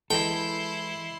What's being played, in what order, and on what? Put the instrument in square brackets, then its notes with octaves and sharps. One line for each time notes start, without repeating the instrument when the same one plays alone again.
[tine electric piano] E3 G#3 [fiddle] E4 C6 [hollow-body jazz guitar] A4 [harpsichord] G5